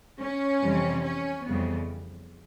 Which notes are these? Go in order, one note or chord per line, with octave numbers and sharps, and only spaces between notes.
C#4
F2 C3 E3 G3
C#4
F2 C#3 E3 G3 B3